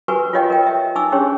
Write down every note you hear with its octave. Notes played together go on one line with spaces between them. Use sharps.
F#4 G4 A#4 B4 G#5 C#6
F4 G4 C#5 D#5 F5 G5
A#4 G5
E5 G5
D#4 G#5 C#6 D6 E6
C#4 D4 G4 G#4 C5 C#5